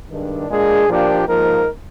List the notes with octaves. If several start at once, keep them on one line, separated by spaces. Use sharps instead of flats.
G2 D#3 G#3 D4
A#2 G#3 D4 G#4
A#2 F3 A#3 D4 G4
G#2 F3 A#3 D#4 A#4